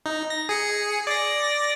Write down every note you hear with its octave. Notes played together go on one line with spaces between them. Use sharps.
D#4
A#6
G#4 C#7
D5 A#6